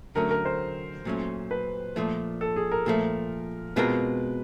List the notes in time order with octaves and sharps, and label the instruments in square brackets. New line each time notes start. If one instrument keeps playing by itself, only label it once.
[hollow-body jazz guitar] D3 F#3 A3 C#4 [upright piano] A#4
[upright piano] A#4
C5
[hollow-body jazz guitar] A#2 F#3 A3 C#4
[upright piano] B4
[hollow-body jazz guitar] A#2 F3 A3
[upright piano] A4
G#4
A#4
[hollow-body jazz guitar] A#2 F3 A3
[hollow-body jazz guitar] B2 G#3 C4 F4 A#4 [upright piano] B4